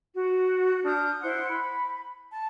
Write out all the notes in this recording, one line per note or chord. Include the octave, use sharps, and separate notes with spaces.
F#4
D4 D#6 F6 G6
E4 C5 F#5 C6
B5
A5